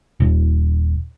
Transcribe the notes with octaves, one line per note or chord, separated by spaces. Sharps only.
D#1